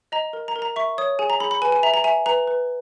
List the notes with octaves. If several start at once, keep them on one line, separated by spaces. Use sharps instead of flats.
D#5 A#5
A#4
A#5
A#4
A#5
E5 C#6
C#5 D#6
G#4 G#5
A#5
G#4 B5
B5
B4 G#5
G#5
E5 A#5
A#5
E5 G#5
B4 A#5
B4